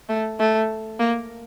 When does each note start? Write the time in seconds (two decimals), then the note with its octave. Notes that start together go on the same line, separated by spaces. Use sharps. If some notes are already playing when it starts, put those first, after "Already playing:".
0.09 A3
0.39 A3
0.99 A#3